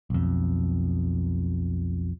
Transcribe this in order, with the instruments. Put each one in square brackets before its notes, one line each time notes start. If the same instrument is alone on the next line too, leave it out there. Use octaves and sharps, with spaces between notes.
[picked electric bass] B1 F2